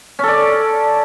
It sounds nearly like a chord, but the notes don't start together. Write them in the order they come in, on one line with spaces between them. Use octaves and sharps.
C#4 A4 D5